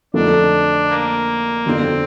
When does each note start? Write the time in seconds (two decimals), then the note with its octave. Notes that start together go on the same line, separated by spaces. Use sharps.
0.14 F2 D3 F3 A3 D4 D#4
0.89 A#3
1.66 G1 F2 D3 C4